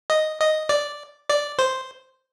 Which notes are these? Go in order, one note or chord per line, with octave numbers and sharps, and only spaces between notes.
D#5
D#5
D5
D5
C5